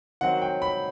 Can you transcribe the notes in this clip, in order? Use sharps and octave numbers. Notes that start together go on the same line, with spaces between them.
D#3 F#3 C4 F#5
G5
B5